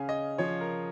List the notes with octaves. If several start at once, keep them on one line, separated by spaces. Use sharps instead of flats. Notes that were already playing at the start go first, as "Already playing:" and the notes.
Already playing: C#3 C#4 F5 G#5
D#5
F3 C#5
A#4